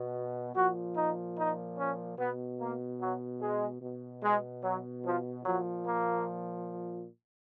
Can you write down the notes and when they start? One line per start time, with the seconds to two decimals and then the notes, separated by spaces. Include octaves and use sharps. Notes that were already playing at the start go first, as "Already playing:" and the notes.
Already playing: B2
0.55 A#2 F3 F#4
0.96 D#4
1.36 D#4
1.77 C#4
2.19 B2 B3
2.59 A#3
3.00 F#3
3.41 G#3
3.82 B2
4.22 G#3
4.64 F#3
5.05 F3
5.45 A#2 F3 F#3
5.86 A#3